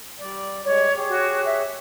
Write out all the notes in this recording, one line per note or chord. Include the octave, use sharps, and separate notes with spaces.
G3 D5
G3 G#3 C#5 D5
G4 G#4 C#5
F#4
E5